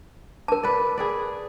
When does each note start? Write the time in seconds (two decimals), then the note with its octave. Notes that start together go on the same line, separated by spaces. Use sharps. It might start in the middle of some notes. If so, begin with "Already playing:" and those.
0.48 A#4 A5
0.63 B4 D5
0.98 G#4 B4 D5